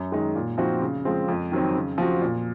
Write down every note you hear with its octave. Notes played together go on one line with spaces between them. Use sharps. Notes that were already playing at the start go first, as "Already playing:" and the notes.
Already playing: F#2
D#3 G#3 D#4
A#2
F3 C4 D#4 F#4
C#3
F3 G#3 C4
F2
D#3 F#3 C4
C#3
F3 C4 F#4
A#2